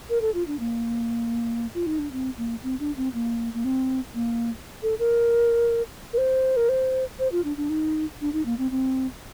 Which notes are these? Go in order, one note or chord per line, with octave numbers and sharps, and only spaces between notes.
A#4
A4
F4
D4
A#3
F4
D#4
D4
C4
A#3
C4
D4
C4
A#3
A#3
C4
A#3
A4
A#4
A#4
C5
A#4
C5
C5
F4
D4
D4
D#4
D4
D#4
A#3
C4
C4